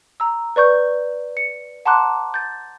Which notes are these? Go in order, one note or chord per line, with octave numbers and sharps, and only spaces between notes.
A#5 E6
B4 D5 C#6 G6
C#7
F#5 A5 A#5 C6 D6 F#6
G6 A6